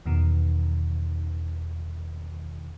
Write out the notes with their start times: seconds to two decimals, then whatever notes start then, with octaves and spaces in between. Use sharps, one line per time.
0.06 E2 B2 D#3